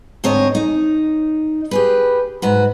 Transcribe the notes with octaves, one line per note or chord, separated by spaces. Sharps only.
D2 G#2 C4 C#5 D#5
D#4
G4 G#4 B4
G#2 F#4 B4